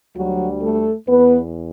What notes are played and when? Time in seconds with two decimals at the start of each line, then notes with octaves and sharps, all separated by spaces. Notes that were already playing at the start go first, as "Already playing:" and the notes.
0.16 D2 D3 F#3 G3 F#4
0.62 A3 A4
1.07 E2 B3 B4